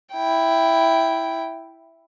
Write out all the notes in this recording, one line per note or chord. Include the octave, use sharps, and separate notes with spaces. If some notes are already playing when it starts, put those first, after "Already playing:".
E4 G5